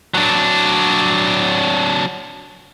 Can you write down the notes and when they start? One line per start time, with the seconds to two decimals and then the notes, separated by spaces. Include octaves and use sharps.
0.14 F#3 D4